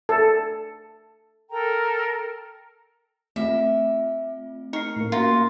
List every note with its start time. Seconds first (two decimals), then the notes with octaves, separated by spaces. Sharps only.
0.09 A4
1.50 A4 A#4 G5 A#5
3.36 A3 C4 F4 E5
4.73 D#4 A#4 C#6 C7 C#7
4.96 A2 A#3
5.12 A#3 C#4 F4 F#4 A#5